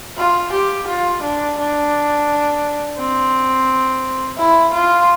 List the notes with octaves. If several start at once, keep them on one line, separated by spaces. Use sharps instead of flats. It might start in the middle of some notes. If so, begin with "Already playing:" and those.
F4
G4
F4
D4
D4
C4
E4
F4